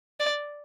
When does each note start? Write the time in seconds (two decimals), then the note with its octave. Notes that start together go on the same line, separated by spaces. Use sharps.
0.20 D5